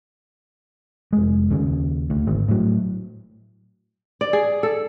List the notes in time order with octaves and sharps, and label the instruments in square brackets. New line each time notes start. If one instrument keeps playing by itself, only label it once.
[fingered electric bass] F1 G#3
D#2 C#3
D2
G#1
A2 F#3
[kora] D5
G#4
A4